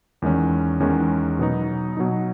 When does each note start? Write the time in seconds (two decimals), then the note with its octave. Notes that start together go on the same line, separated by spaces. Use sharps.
0.22 E2 D#3 G#3 C#4
0.80 E2 D#3 G#3 C#4
1.39 B2 F#3 B3 D#4
1.97 B2 F#3 B3 D#4